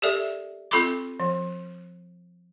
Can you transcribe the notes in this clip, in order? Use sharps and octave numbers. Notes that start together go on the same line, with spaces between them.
G4 A4 A#4 D5 E5
C4 F4 A4 B5 C6 D6
F3